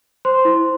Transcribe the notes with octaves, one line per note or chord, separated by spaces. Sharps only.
C5 C6
E4